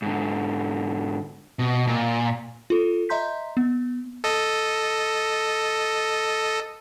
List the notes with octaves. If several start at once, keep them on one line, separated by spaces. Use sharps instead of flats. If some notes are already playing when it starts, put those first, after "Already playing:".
G#2 D3
B2
A#2
F4 A4
D#5 E5 A#5 C6 G6 B6
B3
A4 D#5